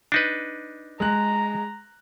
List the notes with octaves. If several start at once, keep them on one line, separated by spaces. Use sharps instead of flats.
D4 D#4 B4
G#3 A#5 F#6